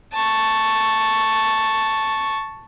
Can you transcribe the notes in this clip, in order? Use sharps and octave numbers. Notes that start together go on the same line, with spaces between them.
A5 C#6